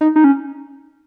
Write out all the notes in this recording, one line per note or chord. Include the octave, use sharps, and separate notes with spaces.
D#4
D#4
C#4